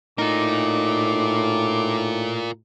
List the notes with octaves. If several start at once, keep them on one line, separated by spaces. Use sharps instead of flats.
A2 D#4 F4 A#4 D6